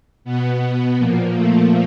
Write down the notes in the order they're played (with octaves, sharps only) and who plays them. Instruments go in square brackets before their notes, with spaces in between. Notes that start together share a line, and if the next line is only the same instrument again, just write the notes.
[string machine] B2 B3
A#2 F3 A#3
A3